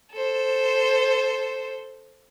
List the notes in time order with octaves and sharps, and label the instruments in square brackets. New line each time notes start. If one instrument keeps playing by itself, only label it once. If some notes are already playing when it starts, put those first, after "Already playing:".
[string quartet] A4 C5